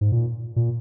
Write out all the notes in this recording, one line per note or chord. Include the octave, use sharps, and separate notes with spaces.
G#2
A#2
A#2